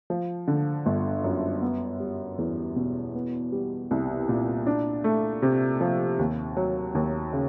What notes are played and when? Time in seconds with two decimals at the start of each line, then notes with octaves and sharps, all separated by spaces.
0.10 F3
0.48 D3
0.86 G1
1.24 F#2
1.62 B3
2.00 G3
2.38 E2
2.76 B2
3.15 B3
3.52 G3
3.91 C2
4.29 A#2
4.67 D4
5.04 A3
5.42 C3
5.81 F3
6.19 D#2
6.57 F#3
6.95 D#2
7.33 C#3